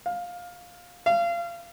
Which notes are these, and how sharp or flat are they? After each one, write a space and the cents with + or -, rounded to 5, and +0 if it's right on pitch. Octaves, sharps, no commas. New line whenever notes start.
F5 +15
F5 -30